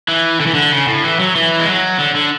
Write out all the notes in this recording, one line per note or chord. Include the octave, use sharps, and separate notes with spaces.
E3
D3
E3
D3
C#3
A2
E3
F#3
E3
G#3
F#3
D3
D3